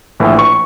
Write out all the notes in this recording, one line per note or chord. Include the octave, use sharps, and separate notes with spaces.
A#1 A2 E3
C#6